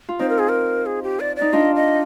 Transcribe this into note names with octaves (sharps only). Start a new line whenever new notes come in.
F4
C4 D#4 C5
A#4
G#4
A#4
G#4
G4
D5
D5
D#4
D4 F4 D#5
D#5